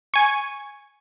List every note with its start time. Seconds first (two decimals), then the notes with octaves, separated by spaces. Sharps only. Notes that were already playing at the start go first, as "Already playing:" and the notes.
0.14 G#5 C#6